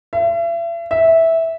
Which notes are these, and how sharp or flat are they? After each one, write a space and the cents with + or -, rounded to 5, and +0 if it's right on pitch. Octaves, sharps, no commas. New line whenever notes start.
E5 +40
E5 -10